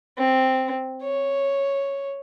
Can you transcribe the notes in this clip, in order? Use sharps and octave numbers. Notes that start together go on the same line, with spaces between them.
C4
C#5